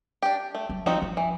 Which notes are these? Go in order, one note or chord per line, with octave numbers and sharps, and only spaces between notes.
D4 G4
A3
F#3
F3 C4 D#4 F#4
F3
E3